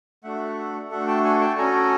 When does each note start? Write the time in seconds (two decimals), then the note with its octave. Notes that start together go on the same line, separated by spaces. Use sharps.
0.24 A3 D4 F#4 A4 E5 F#5
0.91 A3 D4 F#4 A4 E5 F#5
1.07 G5 A5
1.24 F#5 G#5
1.41 G5 A5
1.58 C#4 F#4 A4 G#5 A#5